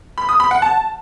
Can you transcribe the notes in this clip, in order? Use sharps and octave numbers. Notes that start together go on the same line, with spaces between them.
B5
D#6
B5
F#5
A5